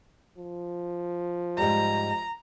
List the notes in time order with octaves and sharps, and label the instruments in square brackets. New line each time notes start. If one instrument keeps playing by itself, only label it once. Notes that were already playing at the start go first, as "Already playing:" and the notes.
[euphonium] F3
[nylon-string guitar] G#2 G3 [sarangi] A#5